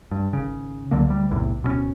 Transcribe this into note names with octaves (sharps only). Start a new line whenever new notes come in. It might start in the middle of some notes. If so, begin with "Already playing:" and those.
G2
G#1 C#3
C#2 D3 F#3 A#3
D2 G3
B1 E2 A2 C3
D1 B2 G#3 C#4